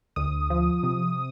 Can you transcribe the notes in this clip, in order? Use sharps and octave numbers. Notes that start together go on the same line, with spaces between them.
D2 D#6
F3
C3